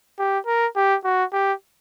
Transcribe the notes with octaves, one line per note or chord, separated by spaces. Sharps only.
G4
A#4
G4
F#4
G4